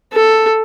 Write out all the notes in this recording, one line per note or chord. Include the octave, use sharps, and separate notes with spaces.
A4